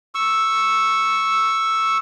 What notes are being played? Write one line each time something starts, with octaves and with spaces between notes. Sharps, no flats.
C#6 E6